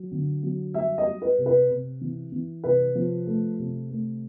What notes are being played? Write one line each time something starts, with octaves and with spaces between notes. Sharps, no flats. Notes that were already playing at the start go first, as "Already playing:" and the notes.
Already playing: F#3
D3
F#3
G3 E5
D#5
G3
B4
C3
B4
C3
E3
E3
C3 B4
F3
A3
C3
A3